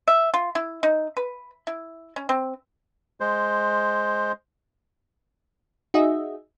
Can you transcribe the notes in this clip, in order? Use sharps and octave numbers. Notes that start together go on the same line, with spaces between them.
E5
F4
E4
D#4
B4
E4
C#4
C4
G#3 C5
D#4 F#4 G#4 D#5 E5